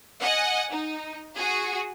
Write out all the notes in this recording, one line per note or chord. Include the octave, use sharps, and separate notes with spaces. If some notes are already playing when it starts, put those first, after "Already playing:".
D#5 F#5 G#5
D#4
F#4 G#4